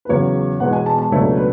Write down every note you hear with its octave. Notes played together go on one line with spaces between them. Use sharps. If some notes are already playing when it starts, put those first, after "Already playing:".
B4
E2 C#3 F#3 C#5
E1 E2 B2 G#3 F#5
G#5
A5
A5
C#2 B2 F#3 A3 D4 C#5
B4